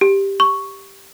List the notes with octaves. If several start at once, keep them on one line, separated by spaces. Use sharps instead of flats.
G4
C#6